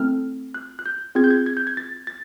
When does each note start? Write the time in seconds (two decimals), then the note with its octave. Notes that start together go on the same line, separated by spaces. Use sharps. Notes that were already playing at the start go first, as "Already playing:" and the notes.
Already playing: A3 C4 E4 A4 F6
0.54 F#6
0.79 F#6
0.86 G6
1.15 C4 F4 G#4 G#6
1.24 G6
1.30 G#6
1.46 G#6
1.57 G6
1.67 G#6
1.77 A6
2.07 A6